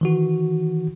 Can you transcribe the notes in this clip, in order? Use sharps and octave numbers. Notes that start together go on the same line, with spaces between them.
D#3 E3 F#4